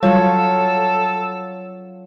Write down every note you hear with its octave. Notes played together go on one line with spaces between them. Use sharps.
F#3 G3 F4 A4 C#5